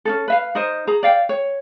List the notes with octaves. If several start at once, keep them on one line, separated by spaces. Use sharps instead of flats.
C#4 D#4 A4
B4 E5 F5
D#4 A#4 C5 D#5
G#4 A#5
D5 F5 G5
C#5